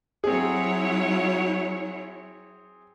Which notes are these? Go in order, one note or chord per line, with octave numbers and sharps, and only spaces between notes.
F#3 C4 E4 G#4 C#5